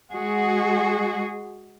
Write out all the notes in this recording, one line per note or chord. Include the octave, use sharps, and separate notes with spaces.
G#3 F#4 G#4